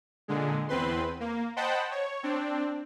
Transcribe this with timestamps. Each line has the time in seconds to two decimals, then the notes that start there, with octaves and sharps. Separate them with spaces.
0.28 A#2 D3 G#3
0.68 E2 C4 B4 C6
1.20 A#3
1.56 C5 D#5 F#5 G5 A5 B5
1.91 C#5
2.23 C4 D4